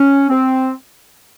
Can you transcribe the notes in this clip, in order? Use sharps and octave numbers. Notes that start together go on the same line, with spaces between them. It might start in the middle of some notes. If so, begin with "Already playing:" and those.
Already playing: C#4
C4